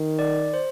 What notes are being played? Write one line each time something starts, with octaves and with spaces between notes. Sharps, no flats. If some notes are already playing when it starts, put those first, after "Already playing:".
Already playing: D#3
D5
C5